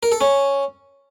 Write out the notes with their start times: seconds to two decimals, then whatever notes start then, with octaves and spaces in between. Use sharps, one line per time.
0.03 A#4
0.12 A4
0.21 C#4